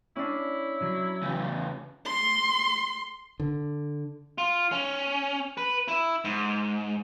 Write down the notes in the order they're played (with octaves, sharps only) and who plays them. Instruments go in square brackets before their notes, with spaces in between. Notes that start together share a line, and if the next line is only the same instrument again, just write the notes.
[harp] C#4 D4 [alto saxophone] E4
[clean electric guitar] F#3
[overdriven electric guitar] E2 C#3
[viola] C6
[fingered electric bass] D3
[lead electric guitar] F4
C#4
B4
E4
G#2